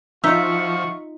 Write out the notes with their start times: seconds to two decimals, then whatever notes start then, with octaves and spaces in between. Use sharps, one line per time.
0.24 F3 D#4 F4 F#4 E5 C#6